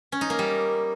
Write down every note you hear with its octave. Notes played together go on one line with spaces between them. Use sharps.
C#4
D#4
A#3
G3